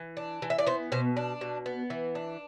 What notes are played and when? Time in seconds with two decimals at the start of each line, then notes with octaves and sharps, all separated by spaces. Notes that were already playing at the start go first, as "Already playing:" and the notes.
Already playing: E3
0.17 D4
0.42 E3
0.50 E5
0.58 D5
0.67 B3 C5
0.92 B2 C5
1.17 D4
1.41 B2
1.66 B3
1.90 E3
2.15 D4